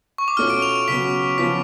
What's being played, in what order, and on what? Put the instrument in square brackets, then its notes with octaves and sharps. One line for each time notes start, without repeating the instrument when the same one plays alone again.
[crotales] C#6
D6
[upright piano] B2 A3 C#4 F4 [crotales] F6
[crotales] D7
F7
D7
[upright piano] C#3 F#3 B3 [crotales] B6
[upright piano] C#3 F3 B3 F4 [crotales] B6